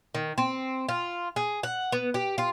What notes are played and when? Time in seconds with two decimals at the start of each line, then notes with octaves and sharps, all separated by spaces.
0.14 D#3
0.38 C4
0.89 F4
1.36 G#4
1.63 F#5
1.92 B3
2.14 G4
2.38 F4